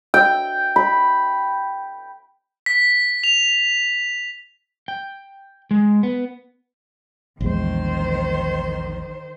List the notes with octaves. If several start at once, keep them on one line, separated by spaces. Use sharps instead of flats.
G5
B5
B6
F7
G5
G#3
B3
A#1 E2 D#3 G#3 C5